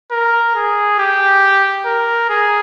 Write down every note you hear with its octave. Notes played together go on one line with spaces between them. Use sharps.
A#4
G#4
G4
A#4
G#4